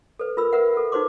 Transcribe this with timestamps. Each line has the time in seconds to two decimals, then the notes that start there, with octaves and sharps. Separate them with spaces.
0.19 A4 B4
0.37 F4 A#4 B5 E6
0.53 A#4 B4 E5 F#5
0.77 A4
0.92 D#4 F#4 B4 C5 C6 D6